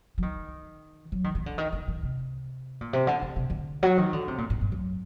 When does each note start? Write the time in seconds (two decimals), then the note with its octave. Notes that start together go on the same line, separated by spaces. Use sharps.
0.18 F#3
0.22 D#3
1.12 F#3
1.24 D#3
1.35 D#3
1.46 D3
1.58 D#3
1.73 D#3
1.88 D#3
2.03 C3
2.81 A#2
2.93 C3
3.07 D3
3.22 D3
3.36 C3
3.50 D3
3.83 F#3
3.98 D#3
4.13 D3
4.28 C3
4.38 A#2
4.50 A2
4.61 G2
4.72 F#2